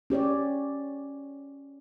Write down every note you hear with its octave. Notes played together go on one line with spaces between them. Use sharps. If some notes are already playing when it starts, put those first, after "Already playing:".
C#4 G4 C#5 D5